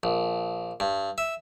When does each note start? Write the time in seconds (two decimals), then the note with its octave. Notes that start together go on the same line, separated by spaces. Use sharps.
0.03 A#1
0.80 G2
1.18 E5